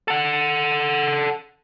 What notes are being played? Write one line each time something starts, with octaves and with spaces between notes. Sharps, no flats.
A4 F#5